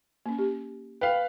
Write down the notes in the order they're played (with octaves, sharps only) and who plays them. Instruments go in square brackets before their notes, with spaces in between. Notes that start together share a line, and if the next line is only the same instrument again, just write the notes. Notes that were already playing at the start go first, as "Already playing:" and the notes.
[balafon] A#3 C#4
G4
[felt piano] B4 F5 [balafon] G5